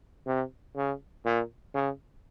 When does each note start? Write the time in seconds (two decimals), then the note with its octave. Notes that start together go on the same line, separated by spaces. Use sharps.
0.27 C3
0.77 C#3
1.26 A#2
1.75 C#3